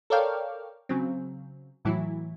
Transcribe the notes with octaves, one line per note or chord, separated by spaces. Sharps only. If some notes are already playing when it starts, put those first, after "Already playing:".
A4 A#4 C#5 D5 F5 G5
C#3 F#3 C4
A2 E3 F#3 E4